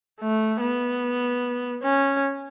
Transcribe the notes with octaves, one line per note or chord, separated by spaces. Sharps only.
A3
B3
C#4